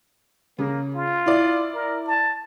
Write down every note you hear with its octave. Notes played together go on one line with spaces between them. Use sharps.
C#3 A#3
F4
E4 D5
A#4
A5